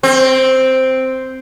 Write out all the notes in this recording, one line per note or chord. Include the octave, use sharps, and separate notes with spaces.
C4